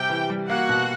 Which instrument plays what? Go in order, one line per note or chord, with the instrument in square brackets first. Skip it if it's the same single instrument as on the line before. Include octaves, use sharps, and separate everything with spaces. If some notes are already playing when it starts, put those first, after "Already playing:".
Already playing: [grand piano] C3 G3 [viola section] G4 G5
[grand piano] E3
G3
[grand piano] A#3 [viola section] F#4 F#5
[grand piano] B2